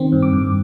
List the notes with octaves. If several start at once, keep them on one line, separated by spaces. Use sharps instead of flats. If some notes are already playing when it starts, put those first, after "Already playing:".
Already playing: D#3 C4
G2
D6
G2